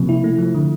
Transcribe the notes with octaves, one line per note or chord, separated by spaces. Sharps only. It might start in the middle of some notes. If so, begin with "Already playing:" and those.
Already playing: C3 F3 A#3
E4
A3
F3
D3